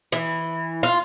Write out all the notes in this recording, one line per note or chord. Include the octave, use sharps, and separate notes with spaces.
E3
F4